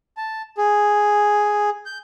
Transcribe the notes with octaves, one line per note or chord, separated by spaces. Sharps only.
A5
G#4
G6